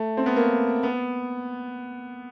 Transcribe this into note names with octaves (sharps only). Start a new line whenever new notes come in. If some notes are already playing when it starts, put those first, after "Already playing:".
Already playing: A3
C4
B3
A#3
B3